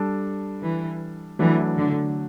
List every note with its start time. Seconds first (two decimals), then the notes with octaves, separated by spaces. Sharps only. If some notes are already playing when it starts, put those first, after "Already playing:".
Already playing: G3 D4 A4
0.61 E3
1.39 E3 F#3 A3 D4
1.78 D3